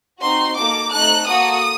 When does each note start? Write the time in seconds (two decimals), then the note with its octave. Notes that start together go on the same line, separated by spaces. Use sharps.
0.20 C4 D#4 F#4 C6
0.56 A#3 D#4 F#4 A4 D6
0.92 A3 C4 D#4 A4 F#6
1.26 A#3 F#4 A4 D#6